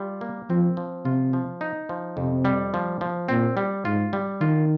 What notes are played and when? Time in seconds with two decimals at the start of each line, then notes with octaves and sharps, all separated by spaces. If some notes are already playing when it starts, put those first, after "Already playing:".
Already playing: G3 F4
0.21 A#3
0.50 F3 C4
0.77 F3
1.05 C3 F4
1.33 F3
1.61 D#4
1.89 F3
2.17 F2 C3
2.45 G3
2.74 F3
3.01 F3
3.28 A#2 C4
3.57 G3
3.85 G#2 F4
4.13 G3
4.41 D#3 F4